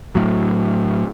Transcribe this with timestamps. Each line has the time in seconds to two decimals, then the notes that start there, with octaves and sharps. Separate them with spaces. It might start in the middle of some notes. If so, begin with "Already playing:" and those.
0.15 A2 F#3